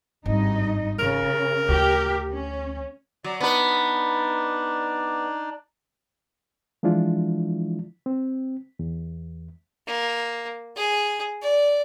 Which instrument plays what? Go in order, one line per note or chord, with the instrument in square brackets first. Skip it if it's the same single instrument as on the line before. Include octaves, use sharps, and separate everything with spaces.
[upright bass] G#1 [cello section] G2 D#4 D#5
[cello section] C#3 [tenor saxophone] A#4
[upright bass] D2 [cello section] G4
[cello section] C#4
[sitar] F#3 [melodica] D5
[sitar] B3 B4 [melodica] D4 D#4 D5
[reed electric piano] E3 F3 G#3 D4 E4 F4
C4
E2
[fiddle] A#3
G#4
D5